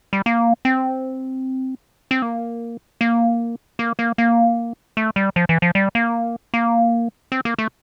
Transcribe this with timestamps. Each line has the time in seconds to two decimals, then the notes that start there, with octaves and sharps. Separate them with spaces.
0.13 G3
0.26 A#3
0.65 C4
2.11 C4
2.22 A#3
3.01 A#3
3.79 A#3
3.99 A#3
4.18 A#3
4.97 A3
5.16 G3
5.36 F3
5.49 E3
5.62 F3
5.75 G3
5.95 A#3
6.54 A#3
7.32 C4
7.45 A#3
7.58 A3